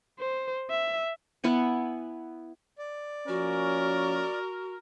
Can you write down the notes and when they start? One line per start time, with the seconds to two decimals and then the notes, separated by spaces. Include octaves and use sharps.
0.19 C5
0.70 E5
1.44 B3 E4 F#5 G#5
2.78 D5
3.28 F3 A#3 C#4 F#4 A#4